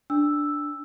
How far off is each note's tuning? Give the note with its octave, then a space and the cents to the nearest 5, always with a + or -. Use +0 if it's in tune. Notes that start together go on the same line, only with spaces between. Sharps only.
D4 +0 E6 +0